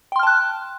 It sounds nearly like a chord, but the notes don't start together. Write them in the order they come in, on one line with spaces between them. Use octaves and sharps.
G5 C6 F6 A5 F#6